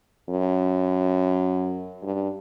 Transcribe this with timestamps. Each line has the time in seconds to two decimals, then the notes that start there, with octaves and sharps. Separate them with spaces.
0.29 F#2
2.03 G2